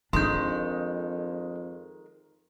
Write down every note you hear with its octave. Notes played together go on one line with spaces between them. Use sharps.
F2 D#3 G#3 D4 C6 G6